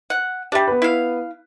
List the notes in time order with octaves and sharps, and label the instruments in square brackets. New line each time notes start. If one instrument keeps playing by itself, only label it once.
[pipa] F#5
[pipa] G3 D4 [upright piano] G4 E5 G5
[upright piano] B3 B4
[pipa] E4 F5